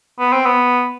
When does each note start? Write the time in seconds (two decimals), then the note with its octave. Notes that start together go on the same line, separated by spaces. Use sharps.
0.19 B3
0.33 C4
0.46 B3